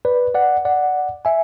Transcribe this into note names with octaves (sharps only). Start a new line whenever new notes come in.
B4 D5
D5 F#5
D5 F#5
E5 G#5